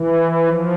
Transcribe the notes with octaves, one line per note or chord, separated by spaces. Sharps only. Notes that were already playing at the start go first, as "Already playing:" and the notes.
Already playing: E3
F3